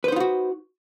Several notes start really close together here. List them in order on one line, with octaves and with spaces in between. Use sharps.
B4 C5 D#4 F4 F#4